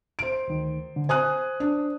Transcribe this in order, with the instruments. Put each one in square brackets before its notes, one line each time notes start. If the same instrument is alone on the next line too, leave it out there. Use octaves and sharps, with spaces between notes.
[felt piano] C5 D7
[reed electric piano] D2 D#3
D3
[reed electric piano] C5 [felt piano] G#5 D#6 F#6
[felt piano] D4